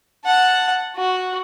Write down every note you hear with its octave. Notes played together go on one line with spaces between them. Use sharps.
F#5 A5
F#4